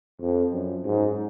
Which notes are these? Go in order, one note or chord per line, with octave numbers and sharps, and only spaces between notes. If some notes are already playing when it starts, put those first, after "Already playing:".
F2
F#2
G#2